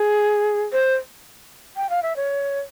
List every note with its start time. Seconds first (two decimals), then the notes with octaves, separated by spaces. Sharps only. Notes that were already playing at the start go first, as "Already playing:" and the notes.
Already playing: G#4
0.73 C5
1.76 G5
1.90 F5
2.03 E5
2.16 C#5